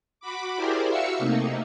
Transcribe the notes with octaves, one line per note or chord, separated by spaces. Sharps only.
F#4 B5 D6
E4 G4 G#4 A#4 C5 D5
F#4 E5 F5 E6 C#7
C3 A3 A#3 D#4